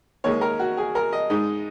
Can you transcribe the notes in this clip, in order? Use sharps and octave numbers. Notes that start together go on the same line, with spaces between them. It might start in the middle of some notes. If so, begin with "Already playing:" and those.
D#2 D#3 G#3 C#5
A#4
F#4
G#4
A#4
D#5
G#2 G#3 D#4